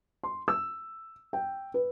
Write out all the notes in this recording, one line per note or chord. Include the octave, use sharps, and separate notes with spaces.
C6
E6
G5
B4